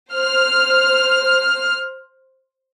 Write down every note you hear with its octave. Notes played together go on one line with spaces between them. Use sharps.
C5 F6